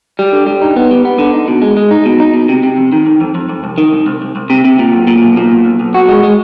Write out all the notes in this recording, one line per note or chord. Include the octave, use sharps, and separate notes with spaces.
G3
D3
G3
D#4
B3
G3
B3
D3
D#4
B2
G#3
G#3
D#4
B2
D#4
B2
C3
C3
F2
D#3
F2
F2
F2
F2
C2
D#3
C2
C2
C2
C2
C3
C3
A#2
B1
A#2
B1
A#2
B1
B1
B1
F#4
G#3
G#3